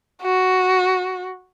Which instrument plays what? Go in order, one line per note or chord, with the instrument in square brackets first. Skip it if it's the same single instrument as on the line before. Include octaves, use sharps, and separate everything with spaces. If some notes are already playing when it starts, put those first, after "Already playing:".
[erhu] F#4